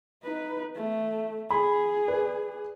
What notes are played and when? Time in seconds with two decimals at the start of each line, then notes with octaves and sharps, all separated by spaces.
0.23 D#4 B4
0.75 A3
1.50 G#4 B5
2.08 B4 D5